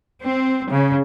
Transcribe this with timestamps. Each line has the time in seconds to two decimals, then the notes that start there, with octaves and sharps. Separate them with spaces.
0.24 C4
0.70 C#3